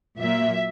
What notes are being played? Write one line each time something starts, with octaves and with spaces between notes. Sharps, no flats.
A#2 F#3 A#3 E5